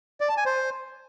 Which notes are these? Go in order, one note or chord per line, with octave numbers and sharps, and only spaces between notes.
D5
A5
G#5
C5